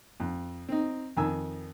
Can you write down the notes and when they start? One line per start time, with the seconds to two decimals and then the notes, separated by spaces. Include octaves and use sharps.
0.20 F2
0.69 C4 D#4
1.17 F2 D#3 G#5 E6